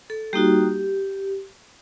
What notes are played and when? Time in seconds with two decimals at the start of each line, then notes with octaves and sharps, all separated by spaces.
0.10 A4
0.33 G3 A#3 D#4 F#4 G4